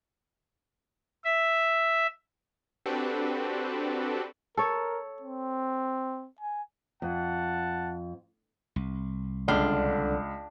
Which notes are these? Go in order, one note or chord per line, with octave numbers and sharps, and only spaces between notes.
E5
C4 D4 F#4 G4 A4 B4
A4 A#4 C#5
C4
G#5
F2 F#5 A5
C2
C#2 D3 D4 F5 C6